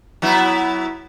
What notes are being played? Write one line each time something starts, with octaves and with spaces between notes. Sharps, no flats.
F#3 B3 E4